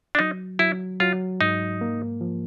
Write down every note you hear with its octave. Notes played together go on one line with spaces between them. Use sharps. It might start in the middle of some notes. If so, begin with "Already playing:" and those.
D4
F#3 D#4
F#3 E4
F#3 F4
G#2 D#4
A#3
F3